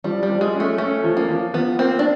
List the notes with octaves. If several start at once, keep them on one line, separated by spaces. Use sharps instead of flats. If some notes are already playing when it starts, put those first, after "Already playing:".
F3 G3
G3
F3
G#3
C#4
A3
A3 C#4
F3
A#3
F3
F3 B3
A#3 C4
D4